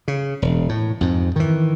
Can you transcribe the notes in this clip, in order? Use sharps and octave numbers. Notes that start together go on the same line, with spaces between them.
C#3
E1
A2
F2 G#2
D#3 E3